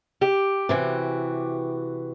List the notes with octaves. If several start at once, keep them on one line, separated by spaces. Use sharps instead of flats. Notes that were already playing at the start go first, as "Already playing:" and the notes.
G4
C3 E3 F#4